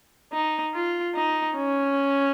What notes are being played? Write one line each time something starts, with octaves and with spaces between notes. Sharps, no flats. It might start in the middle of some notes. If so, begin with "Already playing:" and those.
D#4
F4
D#4
C#4